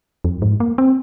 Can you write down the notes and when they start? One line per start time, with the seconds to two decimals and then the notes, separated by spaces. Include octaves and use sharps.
0.24 F2
0.42 G#2
0.60 A#3
0.78 C4